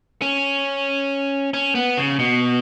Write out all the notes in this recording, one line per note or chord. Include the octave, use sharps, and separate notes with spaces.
C#4
C#4
B3
C#3
B2